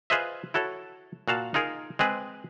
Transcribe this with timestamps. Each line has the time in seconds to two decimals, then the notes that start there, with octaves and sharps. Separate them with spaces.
0.10 F4 G#4 B4 C5 D#5 E5
0.54 E4 F#4 A4 C#5
1.28 A#2 F#4 F5 A5
1.54 D#4 F4 G#4 A#4
1.99 G#3 C4 G#4 B4